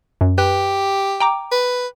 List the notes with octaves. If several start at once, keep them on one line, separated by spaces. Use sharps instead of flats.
F#2
G4 B4
G5 A#5 D6
B4